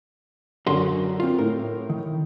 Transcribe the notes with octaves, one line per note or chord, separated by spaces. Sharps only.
F#2 D3 F#4 A#4 C6
C4 F4
A2 A#4
D#3